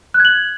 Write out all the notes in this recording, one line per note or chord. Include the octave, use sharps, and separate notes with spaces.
F#6
G#6
F#7